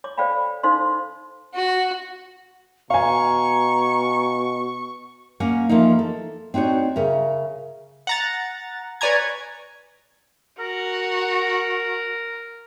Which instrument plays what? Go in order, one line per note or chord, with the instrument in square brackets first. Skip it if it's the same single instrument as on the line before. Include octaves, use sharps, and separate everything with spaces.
[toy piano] C#5 D6
A4 C5 D5 F5 G5 B5
D#4 A4 C5 F5 C6
[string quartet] F#4
[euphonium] B2 [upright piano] F5 G#5 [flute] A#5 [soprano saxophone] C#6
[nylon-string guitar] A#3 C#4 F5 F#5
E3 F3 A3 A#3 D#4
A4
C4 D4 D#4 F#4 C#5
C#3 A#4 E5
[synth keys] F#5 A#5 A6
B4 C#5 D5 G#5 A#5 G#6
[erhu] F#4 [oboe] A#4